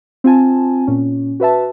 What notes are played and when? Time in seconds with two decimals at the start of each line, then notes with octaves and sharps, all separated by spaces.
0.24 C4 F4 G#5 A5
0.87 A#2 C#4
1.40 F#4 B4 E5 A5